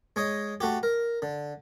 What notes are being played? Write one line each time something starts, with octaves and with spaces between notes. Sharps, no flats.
G#3 C#5 D#5
A3 F#4 G4
A#4
D3